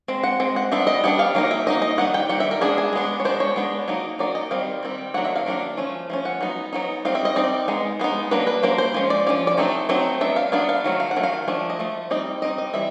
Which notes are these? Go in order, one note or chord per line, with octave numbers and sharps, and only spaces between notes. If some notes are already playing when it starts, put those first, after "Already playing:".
G#3 C4
F#5
G#3 C4
F#5
G3 B3 D4 E5
D#5
G3 B3 D4 F#5
F5
F#3 A#3 D#4
E5
F#3 A#3 D#4 D#5
D#5
D#3 G3 D#4 F#5
G5
D#3 G3 F#5
E5
A#4
G#3 B3 D4 G#4
G#4
G#3 B3 D4
C#5
G#3 B3 D4 C5
C#5
G#3 B3 D4
F#3 A#3 D#4
F#3 A#3 D#4 D5
D#5
D#3 G3 C4 F5
D#3 G3 C4
D#3 F#3 A#3 D4 F#5
E5
F5
D#3 F#3 A#3 D4
F3 A3 C#4
F3 A3 C#4
F#5
F#3 B3 D#4
F#3 B3 D#4
G3 C4 D#4 F5
E5
D#5
G3 C4 D#4 D5
G#3 B3 D#4
G#3 B3 D#4
F#3 A#3 D4 B4
B4
F#3 A#3 D4 C5
C5
F3 G#3 C#4
D5
F3 G#3 C#4 D5
D5
F#3 A3 C4 D#4
F#3 A3 C4 D#4
F#3 B3 D4 E5
F5
F#3 B3 D4 F5
F5
D#3 F#3 A3
F5
F#5
D#3 F#3 A3
F5
F3 A3 D4
D#5
F3 A3
G3 C4 D#4 D#5
G3 C4 D#4 D#5
D#5
E3 G3 E5